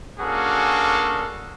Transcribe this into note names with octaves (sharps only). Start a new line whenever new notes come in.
A#3 C#4 D4 F#4 G#4 A4